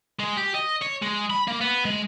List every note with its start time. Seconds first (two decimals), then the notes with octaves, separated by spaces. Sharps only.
0.20 G#3
0.37 G4
0.55 D#5
0.82 C#5
1.03 G#3
1.30 B5
1.48 A#3
1.61 B3
1.85 G#3